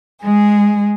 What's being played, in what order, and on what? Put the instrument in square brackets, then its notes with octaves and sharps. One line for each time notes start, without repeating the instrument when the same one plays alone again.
[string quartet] G#3 G#4